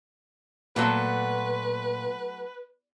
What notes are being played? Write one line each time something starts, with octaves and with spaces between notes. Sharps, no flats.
A#2 F#3 A3 B3 B4